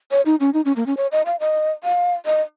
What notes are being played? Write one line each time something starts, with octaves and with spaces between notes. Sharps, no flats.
C#5
D#4
C#4
D#4
C#4
A#3
C#4
C#5
D#5
F5
D#5
F5
D#5